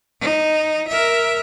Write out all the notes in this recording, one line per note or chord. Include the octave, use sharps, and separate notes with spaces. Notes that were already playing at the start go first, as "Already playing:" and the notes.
D#4
A#4 E5